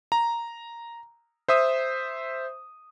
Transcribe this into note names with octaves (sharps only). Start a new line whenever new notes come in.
A#5
C5 E5 D#6